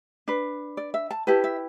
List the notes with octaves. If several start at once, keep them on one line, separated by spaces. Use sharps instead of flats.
D4 B4
D5
E5
A5
E4 G4 B4 A5
E5